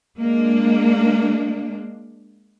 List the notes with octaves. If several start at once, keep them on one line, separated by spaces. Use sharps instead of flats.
G#3 A#3 D4